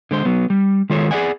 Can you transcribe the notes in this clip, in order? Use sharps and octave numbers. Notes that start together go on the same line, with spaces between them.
D3 G#3 C5
F#3 B3
G3
D#3 G#3 F4 A4 C#5
G#4 B4 D5 F#5 G#5